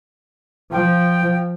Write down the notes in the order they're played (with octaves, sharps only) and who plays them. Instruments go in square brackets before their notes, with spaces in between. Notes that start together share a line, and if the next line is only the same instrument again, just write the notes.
[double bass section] F3 [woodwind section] G5